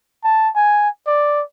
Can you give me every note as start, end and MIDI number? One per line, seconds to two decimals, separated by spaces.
0.24 0.49 81
0.55 0.89 80
1.07 1.42 74